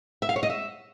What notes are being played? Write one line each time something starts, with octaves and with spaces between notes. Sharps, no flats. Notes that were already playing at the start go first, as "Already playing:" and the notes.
E5
F5
C#5
D#5
E5